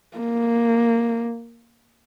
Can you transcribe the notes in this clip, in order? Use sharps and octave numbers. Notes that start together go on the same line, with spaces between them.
A#3